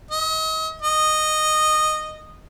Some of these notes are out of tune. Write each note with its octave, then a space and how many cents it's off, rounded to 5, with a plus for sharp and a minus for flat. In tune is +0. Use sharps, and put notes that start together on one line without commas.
D#5 +35
D#5 -10